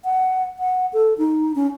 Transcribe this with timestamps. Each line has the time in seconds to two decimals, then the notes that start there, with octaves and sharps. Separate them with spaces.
0.04 F#5
0.59 F#5
0.93 A4
1.18 D#4
1.56 C#4